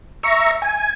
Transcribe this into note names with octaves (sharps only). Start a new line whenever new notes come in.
E5 A#5 C#6
G#5